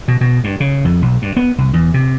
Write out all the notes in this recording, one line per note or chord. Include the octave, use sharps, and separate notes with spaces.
B2
B2
G2
C#3
F2
B1
G2
B3
C2
E2
C3